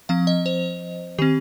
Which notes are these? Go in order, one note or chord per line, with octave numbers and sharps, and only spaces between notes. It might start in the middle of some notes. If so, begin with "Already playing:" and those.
F3 C4 F5
D#5
C5
D#3 C4 G4